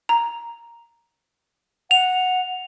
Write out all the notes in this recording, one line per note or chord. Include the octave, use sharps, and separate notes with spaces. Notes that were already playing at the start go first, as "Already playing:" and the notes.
A#5
F#5 F7